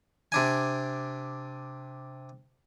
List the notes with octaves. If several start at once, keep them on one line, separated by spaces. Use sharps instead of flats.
C3 D4 G#5